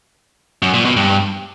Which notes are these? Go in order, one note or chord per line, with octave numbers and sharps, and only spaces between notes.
F#2
A#2
B2
G2